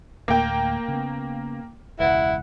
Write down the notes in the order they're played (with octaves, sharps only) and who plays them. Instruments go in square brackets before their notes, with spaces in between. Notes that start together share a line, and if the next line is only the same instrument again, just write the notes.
[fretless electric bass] D2 A2 [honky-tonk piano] A#3 G5
[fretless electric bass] C#3 B3
[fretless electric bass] E1 C#2 [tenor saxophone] E4 [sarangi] F#5